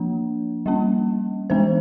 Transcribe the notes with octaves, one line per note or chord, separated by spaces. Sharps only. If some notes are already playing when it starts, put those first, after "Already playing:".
Already playing: F3 A#3 D4
G3 A#3 C#4
E3 G#3 B3 D4 C5